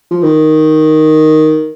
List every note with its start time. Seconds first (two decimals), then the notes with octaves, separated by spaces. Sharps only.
0.11 F3
0.22 D#3